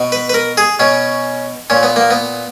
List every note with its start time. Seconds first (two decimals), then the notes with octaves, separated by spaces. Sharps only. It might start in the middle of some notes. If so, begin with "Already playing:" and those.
Already playing: B2
0.12 B4
0.29 B4
0.34 A#4
0.57 G#4
0.79 B2 C#4
1.70 A#2 C#4
1.83 B3
1.96 A#3
2.10 B3